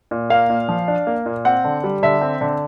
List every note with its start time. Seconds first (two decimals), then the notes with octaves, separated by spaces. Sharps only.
0.11 A#2
0.30 A#3 F5
0.50 A#2
0.69 F3
0.88 D4
1.07 A#3
1.26 A#2
1.45 C4 F#5
1.64 D3
1.84 G3
2.03 D3 E5
2.22 C4
2.41 D3